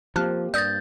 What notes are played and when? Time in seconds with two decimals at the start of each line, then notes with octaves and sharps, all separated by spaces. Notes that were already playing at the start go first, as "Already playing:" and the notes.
0.16 F3 A#3 C4 G4 A5 F6 F#6
0.54 G2 D5 D#6 G6 A6 A#6